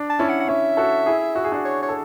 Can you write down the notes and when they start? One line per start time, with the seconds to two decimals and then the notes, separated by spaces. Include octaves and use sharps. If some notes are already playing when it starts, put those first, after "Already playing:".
Already playing: D4
0.10 A5
0.19 C#4 E4
0.29 F#5
0.40 F#5
0.48 C#4 E5
0.77 F#4 A4
1.06 E4 G#4
1.35 F#4
1.44 G#4
1.52 D4 F#4
1.65 C#5
1.82 C#5
1.89 A4